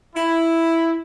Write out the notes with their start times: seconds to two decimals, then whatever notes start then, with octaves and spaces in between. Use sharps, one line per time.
0.16 E4